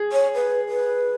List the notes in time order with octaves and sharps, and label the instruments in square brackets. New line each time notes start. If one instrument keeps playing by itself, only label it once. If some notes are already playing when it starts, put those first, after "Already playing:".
Already playing: [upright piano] G#4
[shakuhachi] C#5
B4
B4